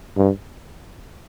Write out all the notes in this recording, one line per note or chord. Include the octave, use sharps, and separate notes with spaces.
G2